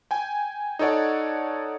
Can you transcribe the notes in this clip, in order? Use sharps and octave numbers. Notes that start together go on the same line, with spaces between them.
G5 G#5
D#4 A4 C#5 D5 F#5